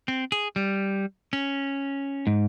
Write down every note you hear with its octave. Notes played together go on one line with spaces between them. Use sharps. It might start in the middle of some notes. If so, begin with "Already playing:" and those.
C4
G#4
G3
C#4
G#2